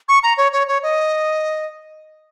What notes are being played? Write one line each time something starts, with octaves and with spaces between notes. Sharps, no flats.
C#6
A#5
C#5
C#5
C#5
D#5